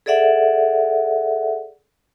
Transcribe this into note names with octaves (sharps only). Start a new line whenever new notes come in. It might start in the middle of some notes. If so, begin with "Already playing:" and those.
G#4 A4 D5 E5 F#5